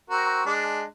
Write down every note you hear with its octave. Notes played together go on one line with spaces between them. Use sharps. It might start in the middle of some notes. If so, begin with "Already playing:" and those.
C4 F#4 A#4
G#3 D4